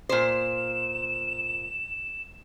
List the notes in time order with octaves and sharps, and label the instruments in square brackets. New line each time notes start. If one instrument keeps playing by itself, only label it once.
[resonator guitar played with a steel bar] A#2 C5 [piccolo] E7